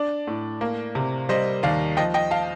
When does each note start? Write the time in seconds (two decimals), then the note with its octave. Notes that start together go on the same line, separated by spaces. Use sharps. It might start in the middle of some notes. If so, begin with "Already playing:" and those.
Already playing: D4 D5
0.27 A2
0.61 A#3
0.95 C3
1.29 G3 C5 D#5
1.63 D#2 D5 F5
1.97 F3 D#5 G5
2.14 D#5 G5
2.31 F5 A5